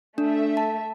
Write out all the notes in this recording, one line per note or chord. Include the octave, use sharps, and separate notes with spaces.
A3 D4 E5
A5